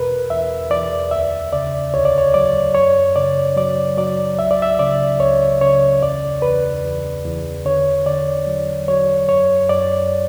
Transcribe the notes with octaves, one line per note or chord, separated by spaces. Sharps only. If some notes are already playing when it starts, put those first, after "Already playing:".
Already playing: E2 B2 A#4 B4
E2 E5
E2 D5
D2 E5
C#3 D5
D2 C#5
D5
C#5
F#3 D5
F#2 C#5
C#3 D5
F#3 D5
F#3 D5
C#2 E5
D5
E5
C#3 D5
C#2 C#5
C#3 C#5
E2 D5
E2 B4
E2
E2
D3 C#5
D3 D5
F#3
F#3 C#5
F#2 C#5
F#2 D5